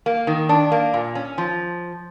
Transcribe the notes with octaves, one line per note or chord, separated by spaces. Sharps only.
A#3
D#3
D4
A#3
A#2
C#4
F3